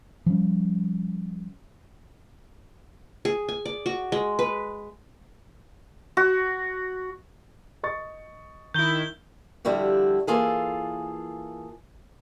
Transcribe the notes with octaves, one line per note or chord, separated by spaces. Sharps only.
F3 G3 C#4
G#4
G#5
D5
F#4
G#3
B4
F#4
D#5 C#6 A6
D#3 E4 G6 G7
D3 F3 G3 E4 F#4 G4
E3 A#3 F4 G#4 A4